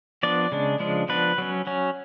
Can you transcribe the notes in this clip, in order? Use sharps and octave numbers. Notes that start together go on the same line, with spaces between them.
F3 B3 D4 D5
C#3 G#3 D4
C#3 F3 G#3 D4
F3 B3 D4 B4
F#3 C#4
F#3 C#4